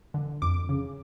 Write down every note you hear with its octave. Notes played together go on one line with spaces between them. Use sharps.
D3
F2 D6
C#3